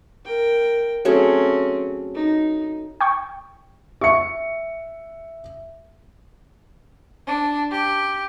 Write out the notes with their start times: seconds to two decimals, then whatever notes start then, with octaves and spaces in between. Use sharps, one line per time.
0.25 A#4 G5
1.05 F#3 A3 C4 C#4 G#4
2.15 D#4
3.01 G5 C#6
4.01 E5 C#6 C#7
7.27 D4
7.72 G4